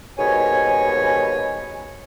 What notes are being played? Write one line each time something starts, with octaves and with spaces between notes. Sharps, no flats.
D#2 G#2 B2 C#5 G#5